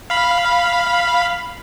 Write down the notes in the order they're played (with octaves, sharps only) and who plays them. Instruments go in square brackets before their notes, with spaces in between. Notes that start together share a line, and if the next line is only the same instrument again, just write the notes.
[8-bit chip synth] F5 B5